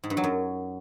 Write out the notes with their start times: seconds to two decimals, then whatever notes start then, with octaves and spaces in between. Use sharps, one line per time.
0.04 G#2
0.10 G2
0.17 F#3
0.24 F#2